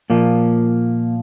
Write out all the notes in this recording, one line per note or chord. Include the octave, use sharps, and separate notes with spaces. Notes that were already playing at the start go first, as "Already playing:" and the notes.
A#2 F3 A#3